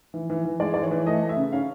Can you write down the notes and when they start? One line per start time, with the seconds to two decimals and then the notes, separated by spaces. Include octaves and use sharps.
0.14 E3
0.30 E3
0.45 E3
0.60 G#3 D5
0.74 E3 D5
0.83 C#5
0.91 E3
1.06 A3 D#5
1.22 A3
1.29 E5
1.37 C#3
1.52 C#4 F5